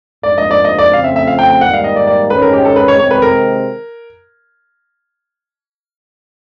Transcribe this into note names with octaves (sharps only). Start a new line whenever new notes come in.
G#2 F3 A#3 D4 D5
D#5
D5
D#5
D5
C#3 F3 A3 C4 F4 F5
E5
E5
F5
G5
G5
G#2 D#3 G3 A#3 F#5
F5
D#5
D5
D5
G#2 D#3 G#3 C#4 B4
A#4
G4
A4
B4
C#5
C3 D#3 G#3 C4 C#5
B4
A#4